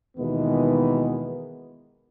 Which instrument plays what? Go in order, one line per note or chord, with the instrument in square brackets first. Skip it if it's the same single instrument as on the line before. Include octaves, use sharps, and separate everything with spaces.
[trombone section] D#2 B2 D#3 E3 G#3 B3